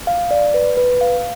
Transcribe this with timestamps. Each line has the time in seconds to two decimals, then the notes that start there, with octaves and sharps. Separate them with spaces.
0.07 F5
0.31 D5
0.54 B4
0.77 B4
1.01 F5